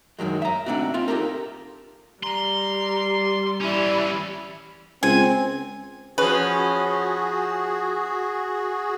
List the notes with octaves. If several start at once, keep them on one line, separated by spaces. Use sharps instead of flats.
F#2 D#3 F#3 G#3
E5 A#5
A3 C4 D4 D#4 F#4
C4 F4 E5
D#4 G4 A4 A#4
G3 A#5 C6
E3 C#4 E4 D5 B5
C#2 C4 G#5
F3 C#4 F#4 G#4 B4